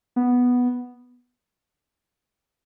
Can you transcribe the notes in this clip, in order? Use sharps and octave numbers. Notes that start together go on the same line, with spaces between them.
B3